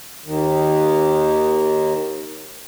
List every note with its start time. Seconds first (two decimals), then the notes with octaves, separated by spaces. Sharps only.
0.25 D#2 D#3